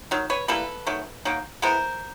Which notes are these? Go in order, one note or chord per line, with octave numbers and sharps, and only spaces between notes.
D#3 F#3
B4 C#5
E3 G3 A#3 A4 B4
D#3 F#3 A3
D#3 F#3 A#3
E3 G#3 B3 A#4 C5